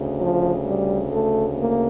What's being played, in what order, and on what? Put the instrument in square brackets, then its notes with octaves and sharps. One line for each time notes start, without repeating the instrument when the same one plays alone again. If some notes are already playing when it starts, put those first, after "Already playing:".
Already playing: [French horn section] D2 C#3
F3
G3
A3
A#3